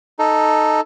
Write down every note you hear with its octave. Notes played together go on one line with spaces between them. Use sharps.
D#4 A4